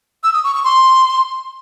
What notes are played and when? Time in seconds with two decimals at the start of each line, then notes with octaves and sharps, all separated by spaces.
0.24 E6
0.34 D#6
0.44 C#6
0.54 C#6
0.64 C6